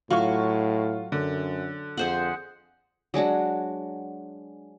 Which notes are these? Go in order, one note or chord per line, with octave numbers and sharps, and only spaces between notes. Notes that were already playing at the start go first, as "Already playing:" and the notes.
A2 F#3 F4 C#6
F#2 D3
F2 G#4 C5 F#5
F#3 G#3 D4 F#4